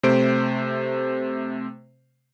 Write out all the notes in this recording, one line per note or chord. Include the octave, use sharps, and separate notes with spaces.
C3 A3 C5 D7